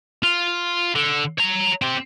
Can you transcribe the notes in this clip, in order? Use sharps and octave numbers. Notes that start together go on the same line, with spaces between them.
F4
D3
C#5 A#5
C4 G4